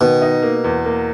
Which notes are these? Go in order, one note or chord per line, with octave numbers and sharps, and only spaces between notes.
B2 D#3
D#4
A#3
E2
A#3